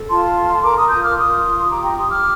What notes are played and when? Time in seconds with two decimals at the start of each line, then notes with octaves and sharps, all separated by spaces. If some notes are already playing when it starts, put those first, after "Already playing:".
Already playing: A4
0.10 F4 A5 C6
0.36 A4
0.63 A#4 A#5 D6
0.77 C6 D#6
0.90 F4 D#6 G6
1.03 D6 F6
1.17 F4 C6 D#6
1.44 F4
1.71 G4 A#5 D6
1.84 G5 A#5
1.97 G4 C6 D#6
2.10 D6 F6